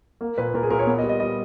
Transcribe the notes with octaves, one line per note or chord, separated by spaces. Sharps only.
A#3
A#2 B4
A#2 A#4
G#4
A#2 A#4
C#5
B3
D#5
G3
D#5
G3 D#5